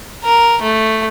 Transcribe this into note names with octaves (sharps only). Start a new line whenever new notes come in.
A#4
A3